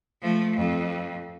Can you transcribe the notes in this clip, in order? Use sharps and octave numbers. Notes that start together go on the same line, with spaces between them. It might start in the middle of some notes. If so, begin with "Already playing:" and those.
F3 A3
F2